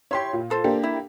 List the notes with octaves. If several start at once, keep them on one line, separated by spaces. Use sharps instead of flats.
E4 G4 C#5 C6
A#2
F4 A4 C5
A#3 D4 G4
E4